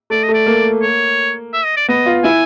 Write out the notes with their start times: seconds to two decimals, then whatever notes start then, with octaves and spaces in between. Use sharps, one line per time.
0.10 A3 D5
0.23 D#5
0.29 A3
0.34 D5
0.46 A#3
0.82 C#5
1.54 E5
1.65 D#5
1.76 D5
1.88 B3 D#5
2.06 F4
2.24 E4 G#5